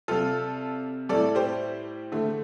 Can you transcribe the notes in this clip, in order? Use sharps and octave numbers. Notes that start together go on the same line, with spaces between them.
C3 G3 F4 A4
A2 G3 A4 D5
G4 C5
D3 A3